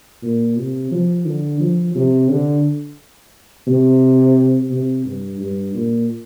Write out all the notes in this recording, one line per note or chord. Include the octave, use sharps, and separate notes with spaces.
A#2
C3
F3
D3
F3
C3
D3
C3
C3
G2
G2
A#2